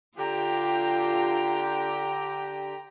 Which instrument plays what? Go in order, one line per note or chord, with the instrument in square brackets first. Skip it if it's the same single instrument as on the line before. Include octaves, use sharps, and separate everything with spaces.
[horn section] D3 G4 [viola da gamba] F4 [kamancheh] G5 A#5